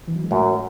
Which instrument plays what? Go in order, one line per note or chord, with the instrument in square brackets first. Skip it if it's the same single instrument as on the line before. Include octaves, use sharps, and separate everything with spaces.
[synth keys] E3
F#3
G#3
[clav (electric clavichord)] F#2 [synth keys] A2 A3